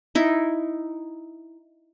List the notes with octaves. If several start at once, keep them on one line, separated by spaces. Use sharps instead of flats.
D#4 E4